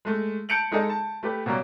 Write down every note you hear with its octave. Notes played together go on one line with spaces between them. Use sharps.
G#3 A3
A5 G6 C#7 D7 F7 F#7
G#3 D#4 G#4 A4 D#5
A5
A3 G4 B4
B2 F#3 G3 A#3 C#4